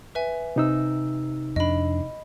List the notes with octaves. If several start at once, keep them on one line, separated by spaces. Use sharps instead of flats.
B4 E5 G#5
C3 D#4 E6
F2 D4 D#5 B5